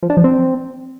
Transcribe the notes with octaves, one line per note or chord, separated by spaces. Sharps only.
F3
D4
F3
C4